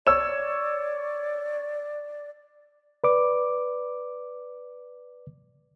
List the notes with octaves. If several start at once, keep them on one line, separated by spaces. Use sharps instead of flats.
C#5 D5 E6 E7
B4 D5 D6